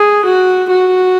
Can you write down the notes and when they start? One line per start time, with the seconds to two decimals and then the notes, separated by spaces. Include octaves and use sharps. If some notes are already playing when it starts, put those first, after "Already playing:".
Already playing: G#4
0.25 F#4
0.70 F#4